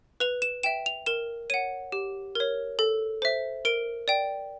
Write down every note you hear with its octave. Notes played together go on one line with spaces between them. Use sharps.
B4 F7
E7
E5 G5 E7
F7
A#4 E7
C#5 F#5 D#7
G4
A#4 C#5
A4
C5 E5
A#4 D7
D5 G5